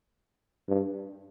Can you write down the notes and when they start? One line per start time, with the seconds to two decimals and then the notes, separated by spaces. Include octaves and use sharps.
0.69 G2